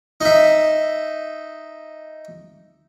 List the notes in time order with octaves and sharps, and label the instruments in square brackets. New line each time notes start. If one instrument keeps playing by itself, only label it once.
[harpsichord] D#4 E5